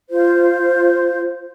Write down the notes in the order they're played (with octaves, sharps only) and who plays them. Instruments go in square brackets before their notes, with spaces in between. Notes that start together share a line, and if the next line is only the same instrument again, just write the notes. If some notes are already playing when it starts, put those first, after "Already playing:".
[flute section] F4 C5